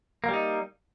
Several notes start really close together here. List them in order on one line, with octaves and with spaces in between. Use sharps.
A#3 G3 D#4